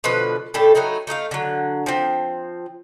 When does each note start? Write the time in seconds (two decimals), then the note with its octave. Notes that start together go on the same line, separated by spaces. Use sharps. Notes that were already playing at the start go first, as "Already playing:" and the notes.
0.04 B2 D3 F3 B4
0.54 A2 G3 A4
0.75 F#3 A3 D#4 E4
1.07 A3 D#4 D#5 F5
1.31 D3 F#3
1.86 F3 C4